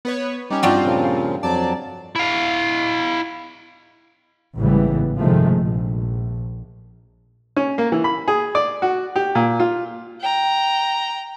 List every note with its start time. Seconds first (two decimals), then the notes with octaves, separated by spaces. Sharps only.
0.05 B3 B4 C#5
0.50 G3 C#4 D#4 G4
0.63 G2 G3 C4 F4 F#4
0.84 A#2 C#3 F3
1.43 F2 F#3 D5 A5
2.16 E4 F5
4.58 A1 G#2 C#3 E3 G3 B3
5.20 G2 C3 D#3 F3 G#3 A3
5.59 A#1
7.56 C#4
7.78 A#3
7.92 E3
8.04 B5
8.28 G#4
8.55 D5
8.82 F#4
9.16 G4
9.35 A#2
9.60 F4
10.21 G5 A#5